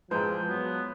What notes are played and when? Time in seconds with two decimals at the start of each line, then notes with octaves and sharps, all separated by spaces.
0.11 A#2 F3 G#3 B4 G5 A5
0.49 F#3 B3